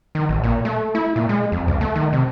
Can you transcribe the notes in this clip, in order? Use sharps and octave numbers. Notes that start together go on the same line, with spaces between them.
D#3
A1
A#2
A3
E4
A#2
G#3
F2
C#2
A3
D#3
C3